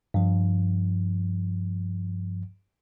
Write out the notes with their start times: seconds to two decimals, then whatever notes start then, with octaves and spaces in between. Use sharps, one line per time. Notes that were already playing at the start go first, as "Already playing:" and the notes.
0.14 G2 F3